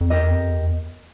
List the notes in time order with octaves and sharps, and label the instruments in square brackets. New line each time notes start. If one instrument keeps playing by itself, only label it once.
[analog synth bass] F2
[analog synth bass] E2 [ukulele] G4 A#4 D#5
[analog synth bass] F2
E2